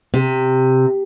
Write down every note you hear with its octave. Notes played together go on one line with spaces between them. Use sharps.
C3